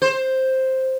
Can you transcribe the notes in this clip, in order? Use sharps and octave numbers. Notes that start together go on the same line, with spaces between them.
C5